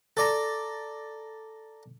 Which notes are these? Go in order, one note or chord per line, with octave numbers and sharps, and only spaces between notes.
A4 D5 A#5